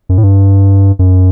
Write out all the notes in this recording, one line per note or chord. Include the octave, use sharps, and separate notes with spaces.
F#2
A2
G2
F#2